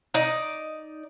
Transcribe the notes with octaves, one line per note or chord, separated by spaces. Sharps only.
D#4 D5